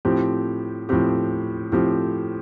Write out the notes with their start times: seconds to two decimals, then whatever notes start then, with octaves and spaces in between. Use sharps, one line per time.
0.05 A2 F3 C4 G4
0.89 A2 F3 C4 G4
1.72 A2 F3 C4 G4